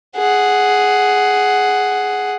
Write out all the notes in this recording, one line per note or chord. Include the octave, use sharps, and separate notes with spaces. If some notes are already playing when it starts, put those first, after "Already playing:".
G#4 F#5